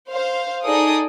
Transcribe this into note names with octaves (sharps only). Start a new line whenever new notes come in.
C5 F5
D#4 G#4 A4 D5 D#6